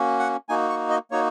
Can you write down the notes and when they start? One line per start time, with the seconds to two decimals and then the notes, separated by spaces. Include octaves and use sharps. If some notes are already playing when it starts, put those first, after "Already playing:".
Already playing: A#3 C#4 F#4
0.19 F#5
0.49 A#3 D#4 F#4 G#5
0.69 C#6
0.90 D#5
1.11 A#3 D#4 F#4 C#5